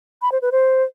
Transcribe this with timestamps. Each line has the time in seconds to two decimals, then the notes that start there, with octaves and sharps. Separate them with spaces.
0.22 B5
0.32 C5
0.42 B4
0.52 C5